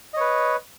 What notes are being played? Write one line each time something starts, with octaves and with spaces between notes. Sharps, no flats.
B4 C#5 D#5